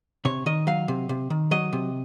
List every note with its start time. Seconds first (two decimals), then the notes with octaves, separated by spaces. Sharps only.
0.25 C3 C#5
0.46 D#3 D#5
0.67 F#3 F5
0.88 C3
1.09 C3
1.30 D#3
1.51 F#3 D#5
1.73 C3